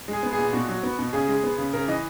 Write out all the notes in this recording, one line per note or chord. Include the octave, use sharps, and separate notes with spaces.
G#3 G#4
B3
G#4
A#2
B2 F#4
F#3
B3
B2
C#3 G#4
G#3
B3
C#3
C#3 A#4
E3 D#5